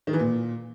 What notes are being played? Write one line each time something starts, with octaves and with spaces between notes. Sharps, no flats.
D#3
E3
A#2